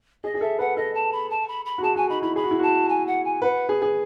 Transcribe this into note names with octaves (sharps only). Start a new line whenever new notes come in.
G#4 D#5
G#4
A4 E5
B4 F#5
A4 D#5
A5
B5
A5
B5
B5
F#4
G#4 A5
F#4 G#5
D#4 B5
E4 B5
G#4 B5
F#4
E4
F#4 A5
G#5
F#5
G#5
B4 F#5
G#4
G#4